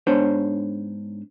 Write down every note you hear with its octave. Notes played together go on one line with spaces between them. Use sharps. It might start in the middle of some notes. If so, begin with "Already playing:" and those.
G#2 B3 D4 C5 C#5